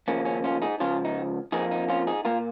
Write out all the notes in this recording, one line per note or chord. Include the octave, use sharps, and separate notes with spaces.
D#2 C#3 F3 A#3 C#4
C#4
C#4 F4
D#4 G#4
C#2 C#3 F3 C#4 F4
D#4
F2 F3 A#3 D#4 G#4
D#4
C#4 F4
D#4 G#4
A#2 A#3 F4 A#4